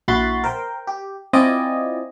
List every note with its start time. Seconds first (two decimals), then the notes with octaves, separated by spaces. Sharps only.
0.08 A#1 E4 F#4 B5 C6 A6
0.44 A#4 C5 G5
0.87 G4
1.33 C4 E4 F4 D5 D#5 G#5